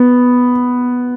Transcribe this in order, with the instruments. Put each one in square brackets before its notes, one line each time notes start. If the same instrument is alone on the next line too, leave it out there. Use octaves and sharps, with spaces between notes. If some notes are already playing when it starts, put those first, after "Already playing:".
Already playing: [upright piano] B3